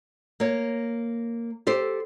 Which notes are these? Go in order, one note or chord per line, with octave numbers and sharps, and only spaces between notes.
A#3 C#5
G4 A4 C5